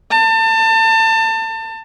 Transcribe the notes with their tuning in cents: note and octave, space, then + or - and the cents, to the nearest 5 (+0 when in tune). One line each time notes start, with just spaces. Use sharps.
A5 +30